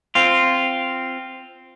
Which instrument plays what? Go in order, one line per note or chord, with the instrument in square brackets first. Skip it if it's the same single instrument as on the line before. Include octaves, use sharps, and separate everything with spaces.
[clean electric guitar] C4 F4